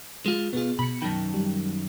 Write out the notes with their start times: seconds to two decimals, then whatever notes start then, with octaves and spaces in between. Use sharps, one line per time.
0.26 G#3 F4
0.53 B2 B3 F4 G#4
0.79 B2 B5 C#7
1.02 F#2 D#3 G5 A5
1.34 G3